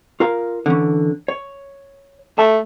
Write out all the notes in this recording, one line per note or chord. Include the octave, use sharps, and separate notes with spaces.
F4 A#4 F5
D3 E3 C#4
C#5
A3 A5